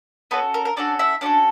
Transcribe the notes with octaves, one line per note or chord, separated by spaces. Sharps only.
B3 C#4 F#4 A4 B4
A#4
A#4
C#4 D4 F#4 A4 D5
E4 E5
C#4 D4 F#4 A4 D5